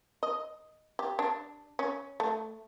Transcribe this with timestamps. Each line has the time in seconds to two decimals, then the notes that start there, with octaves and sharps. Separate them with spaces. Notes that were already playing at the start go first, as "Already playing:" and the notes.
0.23 D#5
0.99 G4
1.19 D4
1.79 C#4
2.20 A3